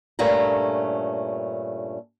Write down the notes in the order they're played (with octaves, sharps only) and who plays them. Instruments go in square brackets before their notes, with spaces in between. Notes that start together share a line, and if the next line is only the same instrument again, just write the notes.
[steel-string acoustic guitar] G2 A#2 A3 C#4 A#5